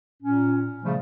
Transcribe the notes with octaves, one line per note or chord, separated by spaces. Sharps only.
A#2 C#4
C#3 F3 G3 A3